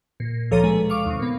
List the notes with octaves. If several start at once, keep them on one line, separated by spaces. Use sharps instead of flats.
A#2
D2 F3 A4 C#5 A#5 D#7
B2 G#3
F5 C#6 D6
D#2 C3
A#2 B3